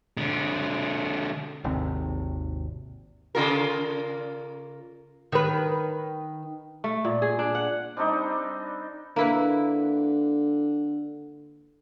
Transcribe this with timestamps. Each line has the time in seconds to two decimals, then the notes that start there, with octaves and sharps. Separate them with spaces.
0.17 D3 G#3
1.64 G#1 D#2 C3
3.35 C#3 F4 A#4
5.32 D#3 B4
6.84 A3
7.05 A#2
7.22 G#4
7.39 D4
7.55 F#5
7.97 G3 C4 D4 D#4
9.16 D3 A#3 E4 B4